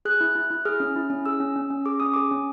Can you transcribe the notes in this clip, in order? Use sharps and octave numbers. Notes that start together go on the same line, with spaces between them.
G#4 F#6
E4
E4
E4
G#4 F6
C#4
E4
C#4
G#4 E6
C#4
C#4
C#4
G#4 D6
C#4 D#6
G#4 D6
C#4